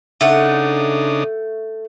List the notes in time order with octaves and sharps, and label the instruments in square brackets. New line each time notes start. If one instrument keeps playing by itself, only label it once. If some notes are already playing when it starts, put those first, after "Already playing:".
[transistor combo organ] C#3 D4 D#4 [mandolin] A3 F#5